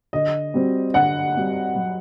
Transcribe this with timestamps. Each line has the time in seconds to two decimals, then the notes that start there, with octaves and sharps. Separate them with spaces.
0.13 D3 D#5
0.54 G3 C4 F#4
0.94 D3 F#5
1.35 G3 C4 F#4
1.75 F#3